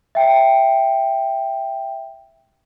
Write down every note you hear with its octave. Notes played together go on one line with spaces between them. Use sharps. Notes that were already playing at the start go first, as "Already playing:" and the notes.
E5 G5